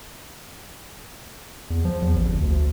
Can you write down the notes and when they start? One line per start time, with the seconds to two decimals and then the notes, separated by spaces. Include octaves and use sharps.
1.70 E2
1.85 F3
2.02 E2
2.16 A1
2.29 G1
2.41 D2